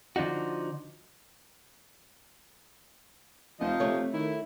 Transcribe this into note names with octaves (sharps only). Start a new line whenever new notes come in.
D3 F3 D4 D#4 F#4
F1 F3 D#4 D#5
C3 A3 C#5
D#3 E4